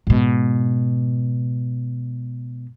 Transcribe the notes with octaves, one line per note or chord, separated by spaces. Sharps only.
G#2 B2